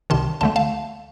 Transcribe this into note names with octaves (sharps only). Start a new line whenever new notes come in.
C2 C3 D#3 A5 C6
D2 D3 A3 A5 C6
F5 A5